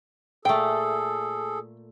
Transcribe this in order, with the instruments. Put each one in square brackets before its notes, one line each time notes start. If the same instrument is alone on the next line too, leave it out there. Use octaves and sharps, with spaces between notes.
[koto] A#2 A3 [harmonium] G#4 A4 [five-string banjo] G5